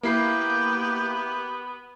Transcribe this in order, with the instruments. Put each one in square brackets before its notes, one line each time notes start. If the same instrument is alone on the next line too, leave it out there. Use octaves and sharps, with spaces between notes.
[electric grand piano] A#3 E4 C7 [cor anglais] B3 [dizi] G4